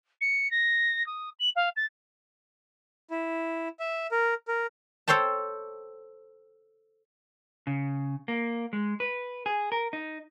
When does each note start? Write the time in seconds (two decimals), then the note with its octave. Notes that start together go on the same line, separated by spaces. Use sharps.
0.21 C#7
0.51 A#6
1.06 D#6
1.39 F#7
1.55 F5
1.76 A6
3.10 E4
3.80 E5
4.11 A#4
4.48 A#4
5.08 A4 C5 C#5 G5 A5
7.67 C#3
8.28 A#3
8.73 G#3
9.00 B4
9.46 G#4
9.72 A#4
9.93 D#4